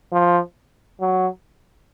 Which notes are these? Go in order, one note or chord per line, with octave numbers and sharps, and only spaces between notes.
F3
F#3